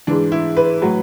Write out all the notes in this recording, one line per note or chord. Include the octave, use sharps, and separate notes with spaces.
G#2 E3 D4
E4
B4
A2 F#3